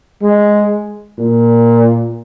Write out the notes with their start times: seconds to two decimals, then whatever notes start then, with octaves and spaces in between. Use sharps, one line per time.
0.22 G#3
1.18 A#2